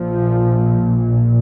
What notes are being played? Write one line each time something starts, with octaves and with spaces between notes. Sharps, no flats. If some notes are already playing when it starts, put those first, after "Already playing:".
Already playing: A#1 A#2 F3